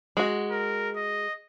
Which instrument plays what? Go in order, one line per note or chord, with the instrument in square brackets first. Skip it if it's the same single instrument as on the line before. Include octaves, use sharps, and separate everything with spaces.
[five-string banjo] G#3 F#4
[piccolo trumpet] A#4
D#5